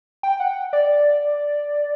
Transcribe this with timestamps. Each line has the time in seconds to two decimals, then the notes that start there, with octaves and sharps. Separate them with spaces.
0.23 G5
0.40 F#5
0.73 D5